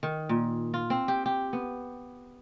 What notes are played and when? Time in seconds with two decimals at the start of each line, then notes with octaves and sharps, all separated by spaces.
0.03 D#3
0.29 A#2
0.74 F4
0.90 C4
1.08 G4
1.26 G4
1.53 B3